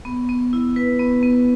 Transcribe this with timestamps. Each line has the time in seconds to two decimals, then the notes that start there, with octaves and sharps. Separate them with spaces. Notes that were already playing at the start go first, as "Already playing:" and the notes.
0.05 B3
0.29 B3
0.53 E4
0.76 B4
1.00 B3
1.23 B3